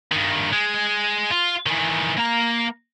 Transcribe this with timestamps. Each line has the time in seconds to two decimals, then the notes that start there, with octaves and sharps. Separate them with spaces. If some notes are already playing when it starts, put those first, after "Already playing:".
0.12 G2 D#3
0.52 G#3
1.31 F4
1.66 D#3 E3
2.18 A#3 A#5